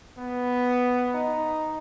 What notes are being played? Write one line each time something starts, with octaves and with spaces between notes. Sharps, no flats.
B3
D#4